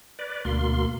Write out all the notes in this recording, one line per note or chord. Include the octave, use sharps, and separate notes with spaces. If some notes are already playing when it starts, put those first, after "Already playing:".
B4 D5
D2 B2 A#3 C6